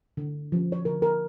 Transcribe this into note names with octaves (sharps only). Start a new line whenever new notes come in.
D3
F3 C#4
C#5
D3 A#4
A#4